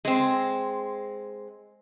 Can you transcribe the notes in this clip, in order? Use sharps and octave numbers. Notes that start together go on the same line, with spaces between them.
G#3 C4